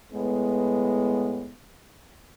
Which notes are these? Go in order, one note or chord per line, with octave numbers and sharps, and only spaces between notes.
A2 G#3 B3